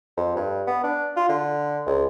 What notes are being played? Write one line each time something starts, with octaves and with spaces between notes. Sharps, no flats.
F2
G2
B3
D4
F4
D3
C#2